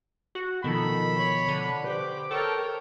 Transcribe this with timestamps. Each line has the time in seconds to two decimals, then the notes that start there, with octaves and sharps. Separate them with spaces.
0.35 F#4
0.64 B2 D#3 F3 A4 B5
1.18 C#5
1.48 D3
1.84 G4 B4 C5 D6
2.31 A4 A#4 C#5 G5